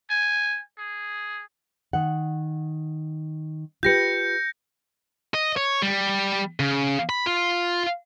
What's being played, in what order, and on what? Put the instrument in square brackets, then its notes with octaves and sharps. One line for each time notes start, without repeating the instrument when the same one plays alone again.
[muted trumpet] G#5
G#4
[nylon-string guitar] D#3 F#5
[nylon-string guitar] F4 G4 B4 [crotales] G6 A#6 C#7
[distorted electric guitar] D#5
C#5
G3
C#3
B5
F4